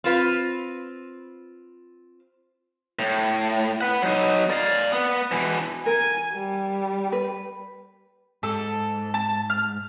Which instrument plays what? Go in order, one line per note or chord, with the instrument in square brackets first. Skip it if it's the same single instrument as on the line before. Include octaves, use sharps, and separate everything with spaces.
[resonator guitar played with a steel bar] C4 F4 B4
[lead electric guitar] A2
B4 F#5
F#3 D#4
D5 F5
B3
B2 E3
[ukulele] A#4 [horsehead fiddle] G#5
[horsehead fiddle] G3
[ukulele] B4
[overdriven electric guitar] G#2 [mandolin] A4
[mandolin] A5
F6